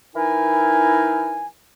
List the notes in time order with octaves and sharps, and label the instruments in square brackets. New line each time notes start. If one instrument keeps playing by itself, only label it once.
[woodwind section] E3 D#4 E4 A#4 G#5